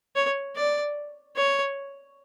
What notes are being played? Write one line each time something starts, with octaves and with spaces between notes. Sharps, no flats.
C#5
D5
C#5